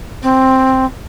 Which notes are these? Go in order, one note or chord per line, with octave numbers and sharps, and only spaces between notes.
C4